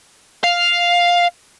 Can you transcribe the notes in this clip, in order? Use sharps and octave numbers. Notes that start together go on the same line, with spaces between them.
F5